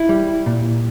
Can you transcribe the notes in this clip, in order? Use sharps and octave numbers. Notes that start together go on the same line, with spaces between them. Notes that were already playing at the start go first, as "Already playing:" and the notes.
Already playing: E4
G3
A#2